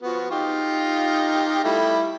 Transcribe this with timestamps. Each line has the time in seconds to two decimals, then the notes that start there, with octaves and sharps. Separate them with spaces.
0.02 F3 B3 F#4
0.31 D#4 F4 G4
1.64 G3 A3 E4